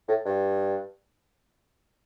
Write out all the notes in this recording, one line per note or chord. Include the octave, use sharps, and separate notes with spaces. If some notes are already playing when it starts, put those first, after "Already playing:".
A2
G2